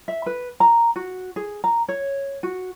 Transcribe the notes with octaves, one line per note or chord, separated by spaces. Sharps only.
E5
B4
A#5
F#4
G#4
A#5
C#5
F#4